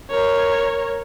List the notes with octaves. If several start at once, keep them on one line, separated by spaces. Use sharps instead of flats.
A#4 C#5